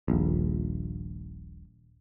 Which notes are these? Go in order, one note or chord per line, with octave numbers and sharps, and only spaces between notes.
D#1 A#1